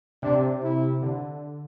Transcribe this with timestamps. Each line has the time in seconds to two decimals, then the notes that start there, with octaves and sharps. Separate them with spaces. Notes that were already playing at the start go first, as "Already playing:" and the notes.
0.23 C3 D4
0.63 E4
1.02 D3